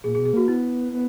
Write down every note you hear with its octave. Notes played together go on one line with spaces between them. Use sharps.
A#2 G#4
G#4
B2
G#4
A#3 F#4
B3 E4
B3